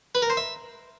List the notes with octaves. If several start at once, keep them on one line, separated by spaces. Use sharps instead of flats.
B4
A#4
C5
E5